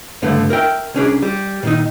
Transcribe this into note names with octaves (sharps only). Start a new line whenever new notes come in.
C#2 G2 D3 A3 B3
A#4 E5 G5
C2 C#4 D4 G#4
G3
A#2 D#3 D#4